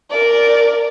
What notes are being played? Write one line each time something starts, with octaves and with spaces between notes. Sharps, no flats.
A#4 D5